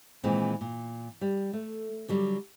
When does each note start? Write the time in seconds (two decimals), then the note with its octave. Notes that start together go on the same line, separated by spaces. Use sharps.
0.23 A#2 D#3 E3 G#3 C4
0.61 A#2
1.21 G3
1.53 A3
2.08 D3 F#3 G3